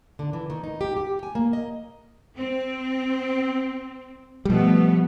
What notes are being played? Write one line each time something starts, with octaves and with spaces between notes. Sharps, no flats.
D3
E3
D#3
D#4
G4
G4
G#5
A#3
D#5
C4
B2 F3 G3 A3 B3